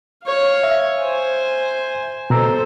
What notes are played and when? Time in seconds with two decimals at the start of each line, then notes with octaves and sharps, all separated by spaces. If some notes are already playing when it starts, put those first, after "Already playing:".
0.24 C#5 F5
0.63 E5
1.01 C5 G#5
2.30 B2 A4 C5 A#5 E6